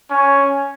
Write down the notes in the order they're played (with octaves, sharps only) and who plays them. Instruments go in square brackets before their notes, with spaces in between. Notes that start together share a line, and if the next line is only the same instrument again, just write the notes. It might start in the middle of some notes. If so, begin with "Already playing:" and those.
[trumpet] C#4